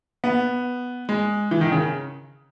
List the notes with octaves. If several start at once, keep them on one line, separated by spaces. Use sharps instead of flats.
B3
G#3
E3
D#3
C#3